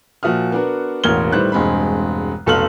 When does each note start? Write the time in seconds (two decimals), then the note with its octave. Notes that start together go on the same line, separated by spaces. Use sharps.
0.23 A#2 F3 F#4 E5 D#6 F6
0.52 B3 D4 F#4 A#4
1.04 E1 A1 A#3 F6 G#6 G7
1.32 A2 D#3 G3 B4 C5 F#6
1.52 E1 G2 G#3 C4 B5
2.46 F1 B1 A4 F5 F6 F#7